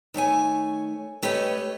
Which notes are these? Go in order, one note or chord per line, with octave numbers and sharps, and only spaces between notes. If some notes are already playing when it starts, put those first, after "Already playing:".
D#3 A3 C#5 G#5
A3 G4 B4 C#5 D#5